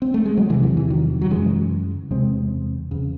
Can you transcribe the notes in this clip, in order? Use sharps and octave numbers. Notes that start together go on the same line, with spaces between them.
C4
A3
G#3
F#3
E2 C3 E3
E3
E3
D#3 F#3
F#3
F#2 C#3 E3 G#3
E2 C3 G#3 C4
E2 C#3